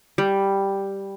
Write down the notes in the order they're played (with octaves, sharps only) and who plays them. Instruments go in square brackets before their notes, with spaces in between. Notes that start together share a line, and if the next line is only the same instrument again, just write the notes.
[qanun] G3